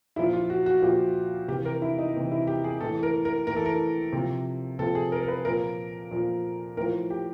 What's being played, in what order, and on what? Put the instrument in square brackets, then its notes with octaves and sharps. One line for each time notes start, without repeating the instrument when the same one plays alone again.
[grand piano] A#2 F3 E4
F4
F#4
F#4
A#2 F3 G4
C3 G4
E3
A#4
E4
D#4
C3 E3
E4
G4
G#4
A2 E3 A4
A#4
A#4
A2 E3 A#4
A4
A#4
C3 F3
C3 F3 A4
G#4
A#4
A#4
B4
A#2 F3 A#4
A#2 F3
A2 A#4
F3
G4